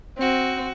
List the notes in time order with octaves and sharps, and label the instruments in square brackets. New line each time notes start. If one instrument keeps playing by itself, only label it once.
[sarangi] C4 [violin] F#4